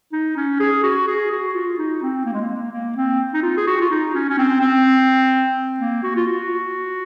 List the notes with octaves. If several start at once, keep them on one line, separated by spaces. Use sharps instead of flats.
D#4
C#4
G#4
F#4
G#4
F#4
F4
D#4
C4
A#3
G#3
A#3
A#3
C4
D#4
F4
G#4
F#4
F4
D#4
C#4
C#4
C4
C4
A#3
F#4
F4
F#4